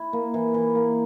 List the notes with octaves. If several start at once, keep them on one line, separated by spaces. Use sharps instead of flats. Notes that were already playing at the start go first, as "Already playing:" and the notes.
Already playing: E4
A#3
E3
E3
A#3